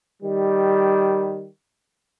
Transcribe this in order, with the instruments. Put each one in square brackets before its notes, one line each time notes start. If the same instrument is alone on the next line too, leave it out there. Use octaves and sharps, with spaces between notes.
[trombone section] D#3 G3